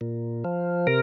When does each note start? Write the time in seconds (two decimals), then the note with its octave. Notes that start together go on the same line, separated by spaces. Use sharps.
0.01 A#2
0.44 F3
0.87 C3 A#4